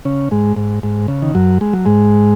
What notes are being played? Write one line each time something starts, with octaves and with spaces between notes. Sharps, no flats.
C#3 C#4
G#2 G#3
G#2
G#2
C#3
D#3
F#2 F#3
G#3
F#3
G#2 G#3